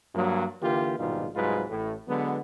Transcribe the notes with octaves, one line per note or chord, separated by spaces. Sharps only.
G2 F#3 A#3
D3 E3 A#3 F4 G4
A#1 G#2 B2 D#3 G3 F4
C2 G#2 F#3 G#3 F4 B4
A1 A2
D3 F#3 G#3 B3